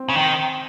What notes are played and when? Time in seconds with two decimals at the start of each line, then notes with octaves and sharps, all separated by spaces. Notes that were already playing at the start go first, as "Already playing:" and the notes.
Already playing: C4
0.09 C#3
0.16 D#3